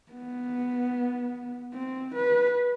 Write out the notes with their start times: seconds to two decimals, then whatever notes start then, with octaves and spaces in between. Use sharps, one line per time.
0.12 B3
1.74 C4
2.15 B4